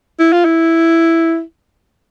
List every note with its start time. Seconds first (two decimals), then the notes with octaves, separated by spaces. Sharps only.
0.19 E4
0.33 F4
0.45 E4